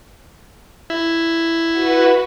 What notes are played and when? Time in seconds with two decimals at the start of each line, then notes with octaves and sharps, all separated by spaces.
0.90 E4
1.72 F#4 B4